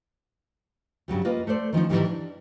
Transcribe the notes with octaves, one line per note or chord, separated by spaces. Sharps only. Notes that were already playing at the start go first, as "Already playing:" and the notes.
G2 C#3 F#3 G3
A#3 F4 B4 D#5
A3 A4 C5 D5
D#3 F3 C#4 D#4
G#2 C3 D#3 E3 F#3 G3
D4